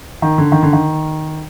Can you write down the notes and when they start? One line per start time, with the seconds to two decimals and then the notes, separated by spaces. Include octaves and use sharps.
0.22 D#3
0.38 D3
0.52 D#3
0.63 D3
0.73 D#3